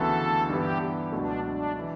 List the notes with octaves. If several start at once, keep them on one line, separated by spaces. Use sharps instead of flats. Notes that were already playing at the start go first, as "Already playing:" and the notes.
Already playing: D2 C#3 E3 B3 F#4 A4
G2 E3 B3 E4 G4
C#2 B2 F#3 A3 D4
D4
E3